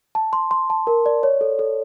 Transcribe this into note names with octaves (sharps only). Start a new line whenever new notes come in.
A5
C6
C6
A5
A#4
D5
C#5
A4
A4